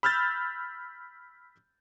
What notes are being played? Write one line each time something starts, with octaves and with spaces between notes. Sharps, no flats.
B5 E6 F6 G6 A6